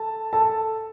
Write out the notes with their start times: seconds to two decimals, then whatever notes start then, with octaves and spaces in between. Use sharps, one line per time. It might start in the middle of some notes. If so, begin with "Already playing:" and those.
Already playing: A4 A5
0.33 A4 A5